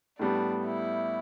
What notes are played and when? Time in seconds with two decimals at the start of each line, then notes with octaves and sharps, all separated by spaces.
0.19 A2 G3 B3 D4
0.66 E4